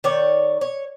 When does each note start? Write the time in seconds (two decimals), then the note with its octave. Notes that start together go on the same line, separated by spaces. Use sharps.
0.04 D#3 C#5 D5
0.61 C#5